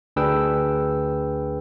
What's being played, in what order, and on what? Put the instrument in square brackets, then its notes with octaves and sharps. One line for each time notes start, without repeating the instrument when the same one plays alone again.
[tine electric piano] D2 D4 G#4 B4 G5 E6